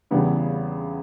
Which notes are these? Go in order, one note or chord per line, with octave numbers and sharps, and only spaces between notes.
E2 C#3 G3 B3